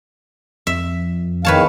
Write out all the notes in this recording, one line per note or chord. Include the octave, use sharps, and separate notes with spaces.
F2 E5
E2 D#3 B4 C#5 F5 A5